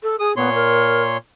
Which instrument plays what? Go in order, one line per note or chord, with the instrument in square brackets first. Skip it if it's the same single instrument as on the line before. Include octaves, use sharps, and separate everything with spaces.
[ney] A4
[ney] G#4 [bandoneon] D#6
[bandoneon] A#2 C#5 C6 [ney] B3
[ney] A#4